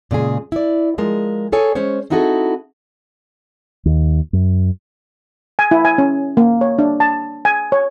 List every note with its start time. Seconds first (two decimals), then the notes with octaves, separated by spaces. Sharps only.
0.11 A#2 C#3 G#3 G#4
0.52 E4 D5
0.98 F3 G#3 A#4
1.52 G#4 A4 C#5 G#5
1.75 G#3 C#4 C5 C#5
2.10 C4 D#4 E4 F#4 G#4 A4
3.86 D#2
4.33 F#2
5.59 G#5
5.71 E4
5.85 G#5
5.98 C#4
6.37 A#3
6.61 C#5
6.79 D4
7.00 A5
7.45 G#5
7.72 C#5